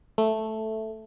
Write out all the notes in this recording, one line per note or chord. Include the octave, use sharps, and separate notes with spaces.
A3